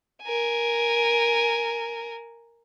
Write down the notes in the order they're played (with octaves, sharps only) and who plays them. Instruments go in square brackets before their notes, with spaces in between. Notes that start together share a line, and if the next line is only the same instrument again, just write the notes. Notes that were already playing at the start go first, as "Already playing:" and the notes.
[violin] A#4 G#5